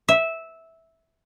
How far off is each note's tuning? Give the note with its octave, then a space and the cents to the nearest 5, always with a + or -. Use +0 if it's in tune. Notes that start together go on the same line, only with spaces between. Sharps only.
E5 -10